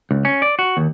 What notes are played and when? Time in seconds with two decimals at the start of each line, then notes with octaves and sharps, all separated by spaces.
0.11 C#2
0.25 C#4
0.42 D5
0.59 F#4
0.77 D#2